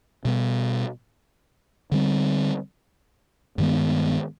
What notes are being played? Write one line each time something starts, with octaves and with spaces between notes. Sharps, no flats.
B2 G3 B3
D3 G3 C4
G2 D#3 G#3 B3